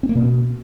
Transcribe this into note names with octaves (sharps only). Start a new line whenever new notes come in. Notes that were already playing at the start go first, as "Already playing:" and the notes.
C4
A#3
B2